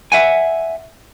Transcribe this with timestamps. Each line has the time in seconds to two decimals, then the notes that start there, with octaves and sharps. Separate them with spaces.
0.12 E5 F#5 G#5